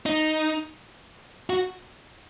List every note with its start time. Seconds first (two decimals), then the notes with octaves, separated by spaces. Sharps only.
0.06 D#4
1.50 F#4